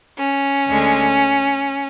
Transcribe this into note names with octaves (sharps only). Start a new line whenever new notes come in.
C#4
D2 D3 G#3